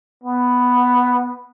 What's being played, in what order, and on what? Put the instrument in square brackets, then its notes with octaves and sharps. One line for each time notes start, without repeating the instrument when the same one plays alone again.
[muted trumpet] B3